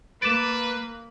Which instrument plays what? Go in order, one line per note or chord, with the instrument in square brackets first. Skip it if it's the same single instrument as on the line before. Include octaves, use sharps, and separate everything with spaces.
[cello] A#3 [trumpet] B4 [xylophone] D6 A6 [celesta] D7 E7